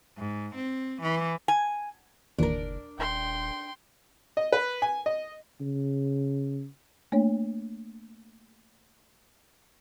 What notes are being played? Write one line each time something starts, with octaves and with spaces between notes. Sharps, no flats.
G#2
C4
E3
G#5
F#1 D#2 A#2 E3 D4 A#4
D#1 G5 C6
D#5
B4
G#5
D#5
C#3
A3 A#3 D4 C#5